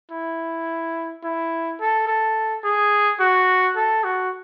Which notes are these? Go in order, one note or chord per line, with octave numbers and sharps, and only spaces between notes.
E4
E4
A4
A4
G#4
F#4
A4
F#4